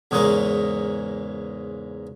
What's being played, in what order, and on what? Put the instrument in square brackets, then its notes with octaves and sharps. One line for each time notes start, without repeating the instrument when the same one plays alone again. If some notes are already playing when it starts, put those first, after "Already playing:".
[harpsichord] E2 G#2 C#3 G#3 A#3